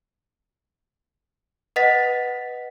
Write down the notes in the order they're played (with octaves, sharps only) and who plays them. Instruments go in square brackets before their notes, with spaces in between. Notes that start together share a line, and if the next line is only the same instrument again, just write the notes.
[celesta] B4 D#5 F#5 A6 B6